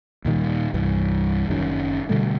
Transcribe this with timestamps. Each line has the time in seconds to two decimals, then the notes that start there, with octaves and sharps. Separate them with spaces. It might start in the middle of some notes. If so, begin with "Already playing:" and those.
0.25 D#2 A#2 D#3 G3
0.74 C2 G2 E3
1.48 F#1 F#2 D#3 C#4
2.09 B2 D3 G3 A3